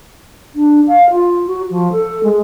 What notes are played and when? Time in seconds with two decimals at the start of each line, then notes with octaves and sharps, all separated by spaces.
0.55 D4
0.87 F5
1.10 F4
1.47 F#4
1.70 F3
1.92 A4
2.24 G#3